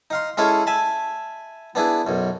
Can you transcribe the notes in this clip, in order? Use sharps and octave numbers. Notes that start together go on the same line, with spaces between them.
D#4 F5 C6
G#3 C#4 E4 G#4 A4 F5
E5 G#5 A5 B5
B3 D4 E4 G#4
B1 F#2